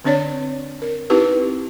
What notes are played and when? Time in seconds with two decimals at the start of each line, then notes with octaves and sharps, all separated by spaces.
0.04 D3 C4 D4 C#5 D5
0.82 A#4
1.10 C4 D#4 E4 G4 B4